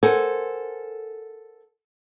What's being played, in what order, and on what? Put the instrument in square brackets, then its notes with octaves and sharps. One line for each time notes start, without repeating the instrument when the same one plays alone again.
[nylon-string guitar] A4 A#4 C5 F#5 G#5